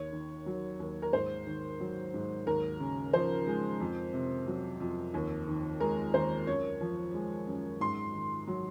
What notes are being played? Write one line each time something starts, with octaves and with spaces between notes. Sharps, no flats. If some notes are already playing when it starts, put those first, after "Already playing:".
Already playing: D#2 C#5
D#3
F#3
D#2
A#4
G#2 C5
D#3
F#3
G#2
D#2 A#4
C#3
F3 C5
G#3
F2
C3
F#3
F2
D#2
D#3
G#3 A#4
D#2 C5
F#2 C#5
F3
G#3
F#2
G#2 C6
D#3
F#3